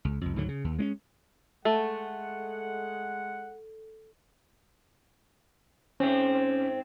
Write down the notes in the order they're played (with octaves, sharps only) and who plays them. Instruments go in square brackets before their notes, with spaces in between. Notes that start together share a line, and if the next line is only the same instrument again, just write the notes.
[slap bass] C#2
C2 F2
D2 G#2 D3 F#3
C#3
D#2
G#3 C4 C#4
[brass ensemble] G#3 F#5 [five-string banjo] A3 [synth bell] A4
[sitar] G#2 C4 [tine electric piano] C#4